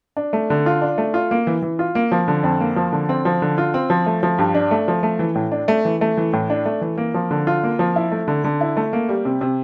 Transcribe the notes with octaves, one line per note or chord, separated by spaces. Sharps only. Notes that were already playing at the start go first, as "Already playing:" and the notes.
D4
A3
D3
F4
D4
A3
F4
A#3
E3
E3
F4
A#3
F3
D3
F2
A#3
F3
D3
C4
F3
D3
F4
C4
F3
A3
F3
G2
D4
A3
F3
A3
E3
A2
D4
A3
E3
A3
E3
A2
D4
A3
E3
A#3
F3
D3
F4
A#3
F3
E4
A3
D3
D3
E4
A3
A#3
G3
C3
C3